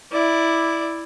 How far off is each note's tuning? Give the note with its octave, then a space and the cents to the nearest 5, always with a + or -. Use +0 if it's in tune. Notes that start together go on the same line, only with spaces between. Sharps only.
E4 +0 D5 +5